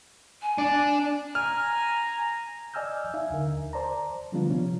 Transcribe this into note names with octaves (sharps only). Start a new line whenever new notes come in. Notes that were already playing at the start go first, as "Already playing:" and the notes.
G#5
D4
G#5 A#5 F6
D5 D#5 G#5 E6 F6 G6
D#4 E5 F5 G#5
D#2 D3 A#4
C5 D5 A5 A#5
D3 F3 G3 B3 D4 F4
C3 F3 C#4